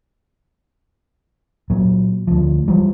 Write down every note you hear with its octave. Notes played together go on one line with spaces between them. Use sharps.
A#2 F#3
D2 F3
E3 F3 G3